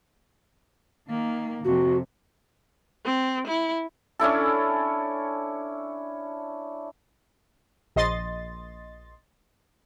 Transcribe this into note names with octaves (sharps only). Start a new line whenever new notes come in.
D#3 A#3
F2 C3 F#4
C4
E4
C#4 D4 E4 A4
A#1 D#5 C6 A6